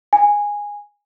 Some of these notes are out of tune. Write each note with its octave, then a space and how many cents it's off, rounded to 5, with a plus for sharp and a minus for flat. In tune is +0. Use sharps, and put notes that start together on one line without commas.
G#5 -10